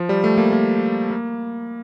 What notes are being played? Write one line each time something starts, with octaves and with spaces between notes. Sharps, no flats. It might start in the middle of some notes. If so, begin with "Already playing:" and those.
Already playing: F3
G3
A3
A#3
A#3
A#3